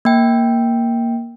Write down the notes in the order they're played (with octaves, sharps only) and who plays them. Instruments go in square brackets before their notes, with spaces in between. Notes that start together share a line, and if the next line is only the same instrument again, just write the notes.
[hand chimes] A#3 G5